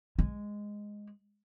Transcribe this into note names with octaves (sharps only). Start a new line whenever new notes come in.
G#3